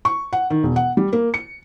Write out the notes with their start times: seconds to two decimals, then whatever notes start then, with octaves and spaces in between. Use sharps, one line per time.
0.05 C#6
0.33 F#5
0.50 D#3
0.63 E1
0.76 F#5
0.97 G3
1.13 A#3
1.34 C#7